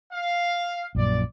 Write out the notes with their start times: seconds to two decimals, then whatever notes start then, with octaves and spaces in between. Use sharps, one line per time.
0.10 F5
0.95 A#1 F#2 A#2 D5